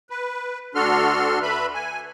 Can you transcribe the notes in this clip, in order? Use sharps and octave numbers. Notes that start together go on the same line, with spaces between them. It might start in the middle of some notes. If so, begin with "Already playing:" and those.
B4
D2 D4 F#4 A4 C6 F6
B4 E5 B5
G#5